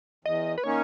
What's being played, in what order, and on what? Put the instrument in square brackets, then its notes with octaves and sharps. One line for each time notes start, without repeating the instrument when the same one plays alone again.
[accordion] E2 [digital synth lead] D#5
[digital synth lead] B4
[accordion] D#3 A#3 C#4 [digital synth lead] C#5